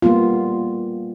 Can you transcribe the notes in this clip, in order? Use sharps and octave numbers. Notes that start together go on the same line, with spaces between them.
G3 A#3 B3 F4